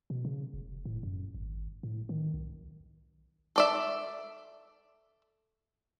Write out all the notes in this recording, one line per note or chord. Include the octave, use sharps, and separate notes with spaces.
B2
C#3
F1
A2
F#2
G#1
A2
D#3
B1
A4 D5 E5